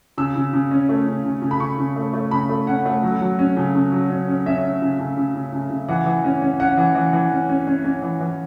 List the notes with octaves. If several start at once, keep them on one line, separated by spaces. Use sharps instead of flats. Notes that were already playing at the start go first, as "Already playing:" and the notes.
C#3 E6
C#3
C#3
C#4
A3
C#3
C#3
C#3
B5
C#3 C#6
C#3
A3
A3
C#3 B5
A3
C#4 F#5
A3
F#3
F#3
C#4
C#3
C#3
F#3
C#4
C#4
C#4 E5
C#4
C#3
C#3
C#3
C#3
C#3
C#3
E3 F#5
E3
C#4
C#4
C#4 F#5
E3
E3
E3
C#4
C#4
C#4
C#4
E3
E3